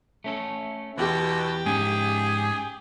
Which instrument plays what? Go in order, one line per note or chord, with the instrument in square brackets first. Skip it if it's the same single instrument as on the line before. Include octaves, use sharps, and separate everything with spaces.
[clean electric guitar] A3 C#4 A4
[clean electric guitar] E2 [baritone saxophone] B2 [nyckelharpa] G4
[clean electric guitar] G#2 C#4 G#5 [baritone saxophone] G#4